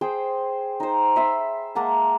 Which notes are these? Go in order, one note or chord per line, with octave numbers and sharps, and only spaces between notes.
G#4 C5 G5
D#4 C5
E5 B5 C6
G#3 A#3 F#5 A5